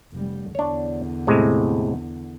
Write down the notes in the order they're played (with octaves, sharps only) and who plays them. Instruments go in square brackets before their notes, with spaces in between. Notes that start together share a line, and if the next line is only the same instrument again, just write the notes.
[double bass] F1 G3
[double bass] E2 D3 [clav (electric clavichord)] D4 C#5
[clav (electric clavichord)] A2 C3 G#3